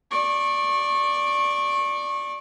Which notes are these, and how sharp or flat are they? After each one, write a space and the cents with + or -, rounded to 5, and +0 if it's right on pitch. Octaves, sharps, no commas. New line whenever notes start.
D5 +0 C#6 -25